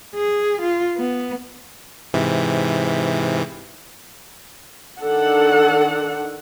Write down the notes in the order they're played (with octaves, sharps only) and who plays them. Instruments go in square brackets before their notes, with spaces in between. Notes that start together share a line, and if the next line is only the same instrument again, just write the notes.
[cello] G#4
F4
B3
[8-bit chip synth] G#2 C3 E3
[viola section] D#3 D4 A4 F#5